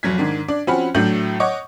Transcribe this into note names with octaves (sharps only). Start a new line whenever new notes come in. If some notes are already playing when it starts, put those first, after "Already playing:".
F1 F#3 G#6 B6
G#2 D#3 D4
D4 D5
F3 C4 C#4 F#4 B5
A2 F#3 A3 D4 G6 F#7
C#5 D#5 F#5 C#6 D6